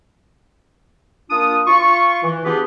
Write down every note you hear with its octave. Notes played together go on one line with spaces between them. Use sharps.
A#3 D4 F4 D#6
F4 C#6
E3
B3 D4 F4 G4 G#4 B4